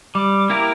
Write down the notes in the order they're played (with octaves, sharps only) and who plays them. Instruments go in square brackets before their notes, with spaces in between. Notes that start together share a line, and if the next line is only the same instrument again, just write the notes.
[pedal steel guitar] G3 [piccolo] D6
[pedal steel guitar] A#3 E4 G4 A#4